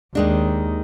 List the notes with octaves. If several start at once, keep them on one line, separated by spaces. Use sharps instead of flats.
D#2 D#3 G#3 D4